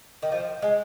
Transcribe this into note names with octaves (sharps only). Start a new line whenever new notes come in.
D#3
F3
G#3